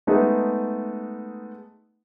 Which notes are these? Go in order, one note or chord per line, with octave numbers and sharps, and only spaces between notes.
G#3 A3 B3 D#4